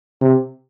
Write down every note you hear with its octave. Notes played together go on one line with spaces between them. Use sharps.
C3